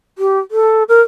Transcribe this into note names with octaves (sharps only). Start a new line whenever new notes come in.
G4
A4
A#4